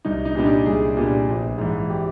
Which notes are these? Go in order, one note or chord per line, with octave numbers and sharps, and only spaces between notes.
C2 D#4
D#4
A#2 G3 B3 D4
D#4
C2 G#4
A#2 G3 B3 D4
A#1
G#2 E3
G4